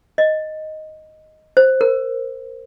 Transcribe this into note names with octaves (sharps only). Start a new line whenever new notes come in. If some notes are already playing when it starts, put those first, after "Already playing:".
D#5
C5
A#4